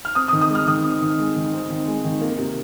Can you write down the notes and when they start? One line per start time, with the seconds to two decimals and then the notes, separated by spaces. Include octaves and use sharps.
0.05 F6
0.15 C4 D#6
0.28 D#6
0.33 D#3
0.41 D#6
0.50 G#3
0.55 F6
0.67 D#3 D#6
0.85 C4
1.02 D#3
1.19 G#3
1.36 D#3
1.54 C4
1.70 D#3
1.87 G#3
2.05 D#3
2.21 A#3
2.38 C3